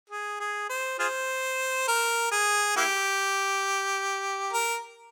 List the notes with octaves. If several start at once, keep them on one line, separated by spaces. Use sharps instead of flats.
G#4
G#4
C5
F4 G#4 C5
A#4
G#4
A#3 E4 G4
A#4